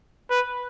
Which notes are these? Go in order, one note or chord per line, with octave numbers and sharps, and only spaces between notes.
B4